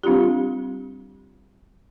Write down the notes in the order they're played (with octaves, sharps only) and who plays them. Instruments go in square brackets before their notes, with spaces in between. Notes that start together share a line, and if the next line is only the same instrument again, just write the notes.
[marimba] G3 C4 D4 F4 G4